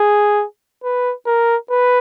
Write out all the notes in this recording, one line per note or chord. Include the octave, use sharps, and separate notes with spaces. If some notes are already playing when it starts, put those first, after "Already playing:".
Already playing: G#4
B4
A#4
B4